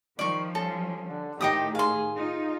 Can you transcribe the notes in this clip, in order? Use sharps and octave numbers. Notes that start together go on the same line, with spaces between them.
D#3 F3 G3 D5 C#6
C#4 A4
D3
A2 D#3 D#4 G4 G5 D#6
G#4 F5 C6
D#4 F4